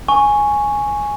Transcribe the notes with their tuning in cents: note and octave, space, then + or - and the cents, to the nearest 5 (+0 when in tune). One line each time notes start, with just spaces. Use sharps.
G#5 +0 C#6 +0